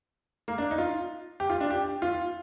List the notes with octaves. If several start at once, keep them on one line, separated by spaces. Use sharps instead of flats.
A#3
D4
D#4
F4
G4
F4
D4
G4
F4